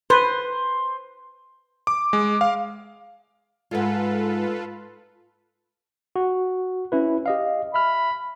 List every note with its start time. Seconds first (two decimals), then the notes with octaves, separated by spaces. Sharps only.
0.10 B4 C5
1.87 D6
2.13 G#3
2.41 F5
3.71 G#2 G#3 F4 A4 B4
6.16 F#4
6.92 C#4 E4 B4
7.26 G4 D#5 F5
7.74 E5 B5 F6